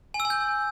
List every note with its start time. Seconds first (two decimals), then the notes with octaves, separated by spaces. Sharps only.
0.14 G#5
0.20 E6
0.25 G#5
0.30 G6